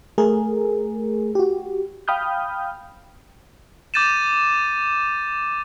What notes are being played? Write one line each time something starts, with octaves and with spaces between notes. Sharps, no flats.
A3 G#4 A#4
F#4 G4
F5 G5 B5 D#6 F6 G6
D6 G6 A6 D#7 E7